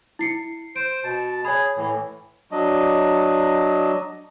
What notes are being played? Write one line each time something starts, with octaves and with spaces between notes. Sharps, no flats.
E4 C7 C#7
C5 D7
B2 A5
G#4 C#5 B5
A2 E3
F#3 D4 D#5